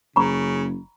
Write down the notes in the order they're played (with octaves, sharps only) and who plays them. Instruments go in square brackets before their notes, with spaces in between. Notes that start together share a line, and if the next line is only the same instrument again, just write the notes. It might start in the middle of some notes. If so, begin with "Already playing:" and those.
[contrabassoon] F#1 [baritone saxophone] C#3 [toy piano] A#5 B5 C#6